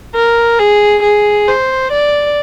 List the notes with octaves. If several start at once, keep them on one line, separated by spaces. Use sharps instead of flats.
A#4
G#4
G#4
C5
D5